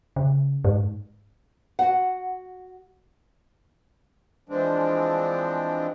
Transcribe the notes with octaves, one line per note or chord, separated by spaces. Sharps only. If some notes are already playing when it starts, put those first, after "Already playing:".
C#3
G#2
F#4 F#5
E3 F3 G#3 C4 D4